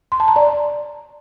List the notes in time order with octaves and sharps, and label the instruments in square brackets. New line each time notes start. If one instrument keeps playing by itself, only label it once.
[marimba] C6
A5
A#5
D5